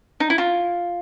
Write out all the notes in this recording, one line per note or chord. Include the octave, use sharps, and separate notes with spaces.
D#4
E4
F4